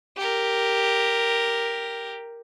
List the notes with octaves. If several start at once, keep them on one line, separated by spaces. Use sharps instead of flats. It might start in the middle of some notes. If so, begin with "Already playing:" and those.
G4 A#4